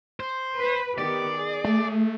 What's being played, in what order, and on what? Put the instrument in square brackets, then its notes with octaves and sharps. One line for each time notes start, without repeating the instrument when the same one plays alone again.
[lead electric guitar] C5
[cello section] B4
[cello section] D#3 B3 G4 [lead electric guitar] D5
[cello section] G#4
[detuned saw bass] A3